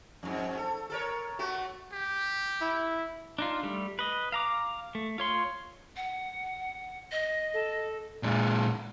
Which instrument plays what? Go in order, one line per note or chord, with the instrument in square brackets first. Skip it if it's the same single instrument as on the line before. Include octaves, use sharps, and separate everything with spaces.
[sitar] F2 G#2
A4
A4 A#4 C#5
A3 F#4
[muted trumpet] G4
[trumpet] E4
[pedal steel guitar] D4 D#4 F4
G3 A3
B4 D#5
F5 A#5 D6
A3
F4 C#5 C6
[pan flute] F#5
D#5
[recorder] A4
[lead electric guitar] A#2 G#3